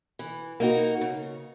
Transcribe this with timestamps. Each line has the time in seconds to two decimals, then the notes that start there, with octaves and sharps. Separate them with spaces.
0.19 E3
0.60 A#3 D#4 F#4
1.01 C#3